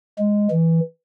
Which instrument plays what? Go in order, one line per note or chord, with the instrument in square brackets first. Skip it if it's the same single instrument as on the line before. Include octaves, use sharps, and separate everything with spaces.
[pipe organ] G#3
E3